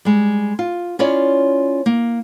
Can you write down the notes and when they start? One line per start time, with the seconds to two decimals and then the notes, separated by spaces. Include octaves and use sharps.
0.05 G3 G#3
0.59 F4
0.99 C#4 E4 F4 C#5 D5
1.86 A#3